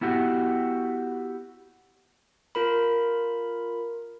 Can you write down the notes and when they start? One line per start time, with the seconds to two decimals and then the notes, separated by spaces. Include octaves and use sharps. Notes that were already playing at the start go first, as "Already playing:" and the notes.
0.01 B3 E4 F#4 G4
2.55 F4 A#4 B5